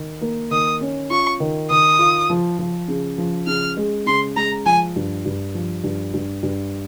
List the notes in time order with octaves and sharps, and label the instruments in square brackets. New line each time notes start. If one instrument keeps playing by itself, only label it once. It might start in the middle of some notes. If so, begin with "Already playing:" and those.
Already playing: [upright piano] D#3
A#3
[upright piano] D#3 [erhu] D#6
[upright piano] C#4
[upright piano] F4 [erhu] C#6
[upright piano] D#3
[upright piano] D#3 [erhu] D#6
[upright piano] F4
F3
F3
C#3
F3
[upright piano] C#3 [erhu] F6
[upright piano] G#3
[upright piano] C#3 [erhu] C6
[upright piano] G#3 [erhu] A#5
[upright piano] F3 [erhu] G#5
[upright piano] G2
G2
F3
G2
G2
G2